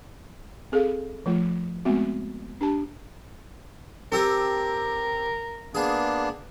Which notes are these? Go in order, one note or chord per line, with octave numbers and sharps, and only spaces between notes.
C4 G#4 A4 F5
F3 A3 F4
G#3 A3 B3 C4 F#4
D4 G4 A5
C4 G4 A4 A#4
A#3 B3 D4 G#4